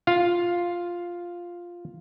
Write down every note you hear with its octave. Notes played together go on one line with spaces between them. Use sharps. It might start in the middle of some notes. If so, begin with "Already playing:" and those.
F4 F5